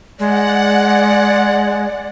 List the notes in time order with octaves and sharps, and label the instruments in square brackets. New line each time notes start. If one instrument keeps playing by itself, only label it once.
[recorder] G#3 [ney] D5 [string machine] F#5